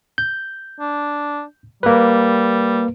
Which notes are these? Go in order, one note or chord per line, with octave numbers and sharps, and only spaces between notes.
G6
D4
G3 A#3 B4